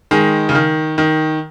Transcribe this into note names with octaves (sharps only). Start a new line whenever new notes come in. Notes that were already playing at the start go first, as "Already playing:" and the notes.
D#3 G#3
C#3
D#3
D#3